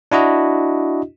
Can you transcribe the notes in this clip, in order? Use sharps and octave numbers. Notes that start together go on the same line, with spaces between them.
D4 E4 F#4 D#5